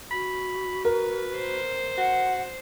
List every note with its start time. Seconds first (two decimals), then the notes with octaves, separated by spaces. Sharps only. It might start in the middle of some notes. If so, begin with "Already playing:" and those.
0.11 F#4 B5
0.85 A#4 B4
1.37 C5
1.97 F#4 F#5